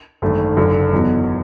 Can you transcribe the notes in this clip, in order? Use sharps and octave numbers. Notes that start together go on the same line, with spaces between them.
G#1 F#2 D3 A3
F#1 F#2 D3
E2 B2 F#3